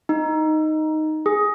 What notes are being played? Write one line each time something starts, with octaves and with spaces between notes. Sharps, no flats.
D#4
G#4